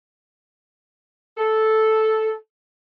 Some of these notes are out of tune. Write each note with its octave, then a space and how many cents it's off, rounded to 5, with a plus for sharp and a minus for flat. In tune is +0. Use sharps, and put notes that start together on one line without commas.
A4 -5